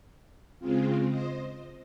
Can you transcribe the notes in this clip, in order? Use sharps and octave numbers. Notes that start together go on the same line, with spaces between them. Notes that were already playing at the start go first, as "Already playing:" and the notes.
C#3 G#3 C4 F4
C5 D#5